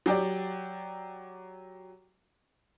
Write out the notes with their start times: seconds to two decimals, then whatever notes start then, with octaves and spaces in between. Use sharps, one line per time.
0.06 F#3 G4 D5